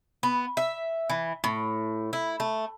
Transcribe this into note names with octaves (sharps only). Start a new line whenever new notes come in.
B3
E5
E3
A2
E4
A3